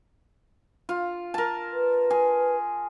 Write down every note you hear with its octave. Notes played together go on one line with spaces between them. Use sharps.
F4
A#4 A5
B4
G#4